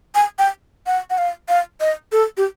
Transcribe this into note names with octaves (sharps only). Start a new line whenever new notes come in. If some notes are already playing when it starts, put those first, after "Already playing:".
G#5
G5
F#5
F#5
F5
F5
D#5
A4
G4